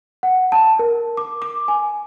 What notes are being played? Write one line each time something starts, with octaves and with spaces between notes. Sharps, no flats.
F#5
A5
A#4
D6
D6
G#5